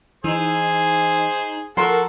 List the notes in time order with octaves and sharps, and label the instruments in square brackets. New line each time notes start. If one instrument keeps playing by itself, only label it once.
[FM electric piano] E3 [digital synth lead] D#4 [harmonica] G#4 C5
[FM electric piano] F3 [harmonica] F#4 A4 [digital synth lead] A#4 [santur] C6